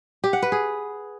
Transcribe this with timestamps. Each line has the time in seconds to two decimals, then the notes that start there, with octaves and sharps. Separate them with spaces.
0.24 G4
0.33 F#5
0.42 B4
0.52 G#4